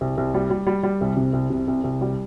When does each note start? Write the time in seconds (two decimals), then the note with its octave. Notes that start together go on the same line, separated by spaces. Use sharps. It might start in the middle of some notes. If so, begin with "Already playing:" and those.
0.01 C2
0.17 C2
0.34 G3
0.50 G3
0.67 G3
0.83 G3
1.01 C2
1.17 C3
1.33 C2
1.50 C3
1.68 C2
1.84 C2
2.01 G3